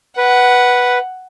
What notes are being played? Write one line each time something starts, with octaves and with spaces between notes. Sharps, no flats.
B4 F#5